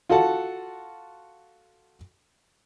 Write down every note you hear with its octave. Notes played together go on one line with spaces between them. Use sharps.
F4 F#4 A4 F#5 A5